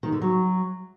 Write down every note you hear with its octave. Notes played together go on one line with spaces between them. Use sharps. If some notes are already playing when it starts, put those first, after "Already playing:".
D#3
D3
F#3